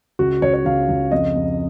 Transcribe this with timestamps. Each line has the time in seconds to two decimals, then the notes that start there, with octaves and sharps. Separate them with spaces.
0.19 C#2 F#4
0.42 C#2 C#5
0.53 C#5
0.65 C#2 F5
0.89 C#2
1.11 F2 D#5
1.35 F2